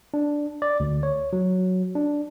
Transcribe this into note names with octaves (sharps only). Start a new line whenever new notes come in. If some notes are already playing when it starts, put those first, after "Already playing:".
D4
D5
D2
C#5
F#3
D4